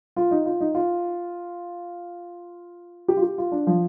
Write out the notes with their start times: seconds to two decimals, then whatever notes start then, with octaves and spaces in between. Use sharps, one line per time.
0.16 F4
0.31 D#4
0.46 F4
0.61 D#4
0.75 F4
3.08 G4
3.17 F4
3.23 G4
3.38 F4
3.52 D4
3.67 F3